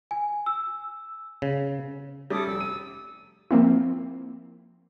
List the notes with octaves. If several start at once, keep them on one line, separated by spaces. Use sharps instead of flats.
G#5
E6
C#3
G3 A3 C#4 A4 D6 D#6
F1 E6
D#7
F3 A#3 C4 E4